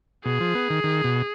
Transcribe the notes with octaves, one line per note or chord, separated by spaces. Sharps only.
B2 G#4
F3
B3
D#3
D#3
B2